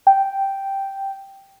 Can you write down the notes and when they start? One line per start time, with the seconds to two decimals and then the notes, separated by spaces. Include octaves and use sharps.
0.07 G5